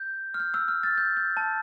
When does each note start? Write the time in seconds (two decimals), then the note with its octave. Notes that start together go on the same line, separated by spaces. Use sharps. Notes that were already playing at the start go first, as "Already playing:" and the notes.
Already playing: G6
0.34 F6
0.40 G6
0.54 E6
0.68 F6
0.83 F6 A6
0.98 G6
1.17 G6
1.37 A5